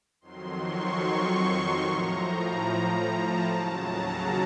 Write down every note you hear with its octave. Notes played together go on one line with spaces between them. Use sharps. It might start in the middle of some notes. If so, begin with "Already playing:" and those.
F2 D#3 F#3 C6
C#6
A2 F3 A#5
A5
D#2 C#3 F#3 A5
A#5